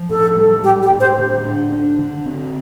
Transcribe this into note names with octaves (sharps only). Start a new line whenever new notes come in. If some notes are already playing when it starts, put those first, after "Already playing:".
Already playing: F3
A2 A4
G3
G3 G4
G4
A2
C5
D3
D4
D4
D3
C4